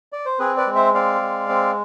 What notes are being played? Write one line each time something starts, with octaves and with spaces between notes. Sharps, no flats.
D5
C5
C4 G#4 B4
B4 D5
G#3
C5 E5
C4 D5 F5
G#3
C4